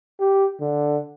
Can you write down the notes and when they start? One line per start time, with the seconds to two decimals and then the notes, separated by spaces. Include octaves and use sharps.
0.20 G4
0.60 D3